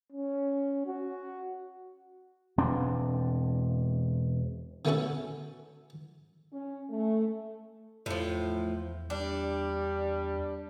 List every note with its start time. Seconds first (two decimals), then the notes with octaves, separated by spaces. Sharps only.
0.12 C#4
0.87 F#4
2.58 E1 C4 D4
4.85 D3 A3 B3 C#4 F#4 A4
6.53 C#4
6.89 A3
8.06 E2 A2 F3
9.10 G3 D4